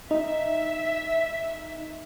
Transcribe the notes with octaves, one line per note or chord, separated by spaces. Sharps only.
D#4 E5